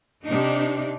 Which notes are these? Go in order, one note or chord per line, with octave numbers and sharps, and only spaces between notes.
C3 D4 D#4